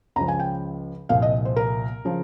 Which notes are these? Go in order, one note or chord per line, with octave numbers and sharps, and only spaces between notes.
C#2 C#3 F3 A#5
G#5
G5
C2 A#2 F3 F5
D#5
C5
A#4
C#3 F3